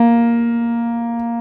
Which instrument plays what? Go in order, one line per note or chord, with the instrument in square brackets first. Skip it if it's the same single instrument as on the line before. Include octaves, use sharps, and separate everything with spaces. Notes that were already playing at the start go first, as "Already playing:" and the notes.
Already playing: [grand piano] A#3